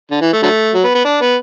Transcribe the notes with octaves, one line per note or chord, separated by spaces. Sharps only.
D3
E3
A3
D3 F#3 A3
F#3
B3
B3
D4
B3